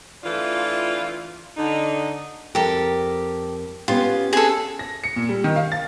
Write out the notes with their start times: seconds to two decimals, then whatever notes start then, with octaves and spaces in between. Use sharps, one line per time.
0.24 E3 A3 D4 F4
1.57 D3 D#4
2.55 F2 G4 A4 A#4
3.88 B3 C#4 F4 G4
4.33 G#4 A4
4.79 A#6
5.04 C#7
5.16 A#2
5.29 G3
5.44 D#3
5.56 F5
5.72 A6